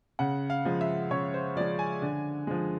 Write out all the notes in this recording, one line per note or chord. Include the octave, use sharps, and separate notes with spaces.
C#3 F#5
F5
F3 G#3
E5
C#3 C#5
C5
F3 G#3 D5
G#5
D3
F3 G#3